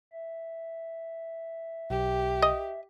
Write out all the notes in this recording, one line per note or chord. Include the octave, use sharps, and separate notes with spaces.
E5
B1 G4
D#5